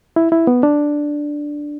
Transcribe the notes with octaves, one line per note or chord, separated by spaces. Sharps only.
E4
E4
B3
D4